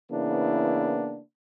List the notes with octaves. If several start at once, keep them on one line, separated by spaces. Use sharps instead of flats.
C#3 E3 A#3 B3 D4 E4